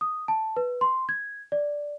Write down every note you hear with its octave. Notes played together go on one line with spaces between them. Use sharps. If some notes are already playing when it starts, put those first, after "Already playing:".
D#6
A5
B4
C6
G#6
D5